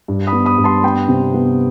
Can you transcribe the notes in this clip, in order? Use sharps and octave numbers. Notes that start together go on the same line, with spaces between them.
G2
B5 D#6
B3
B5 D#6
G2
A5 C6
B3 G5 B5
C3
B3